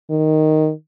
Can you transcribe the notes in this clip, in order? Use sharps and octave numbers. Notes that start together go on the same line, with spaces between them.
D#3